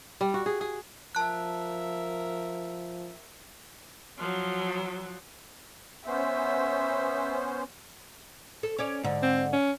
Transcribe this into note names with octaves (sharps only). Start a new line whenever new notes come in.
G3
F#4
G#4
G#4
F3 A#4 E5 A5 F#6
F3 F#3
B3 C#4 C5 E5
A4
C#4 C#5 D5
G#2 D3
C4
C#4